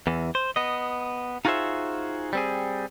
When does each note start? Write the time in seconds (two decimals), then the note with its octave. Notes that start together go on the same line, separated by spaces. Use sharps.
0.07 E2 E3
0.35 C5
0.56 B3 D#5
1.45 D#4 F4 F#4 G#4 C5 E5
2.33 G3 C4 G#4